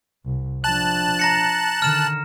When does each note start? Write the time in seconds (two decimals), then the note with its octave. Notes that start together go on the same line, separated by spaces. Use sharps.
0.25 C2
0.64 F3 D4 A5 F#6
1.19 A#5 A#6 C#7
1.82 D3 D#3 F6 E7